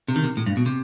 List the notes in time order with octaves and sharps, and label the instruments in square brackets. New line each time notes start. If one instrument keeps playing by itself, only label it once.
[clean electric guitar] C3
D#3
C3
A2
G2
B2
C3